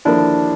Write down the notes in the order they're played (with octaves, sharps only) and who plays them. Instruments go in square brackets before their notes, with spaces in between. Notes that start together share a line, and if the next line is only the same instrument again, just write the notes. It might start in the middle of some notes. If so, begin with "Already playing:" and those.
[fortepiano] D#2 D3 F3 A#3 [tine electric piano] D4 E4